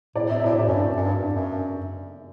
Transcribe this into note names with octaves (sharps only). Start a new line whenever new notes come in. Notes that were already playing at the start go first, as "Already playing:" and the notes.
A2 D5
E5
E5
A2 D5
D5
F#2
G2
F#2
G2
G2
F#2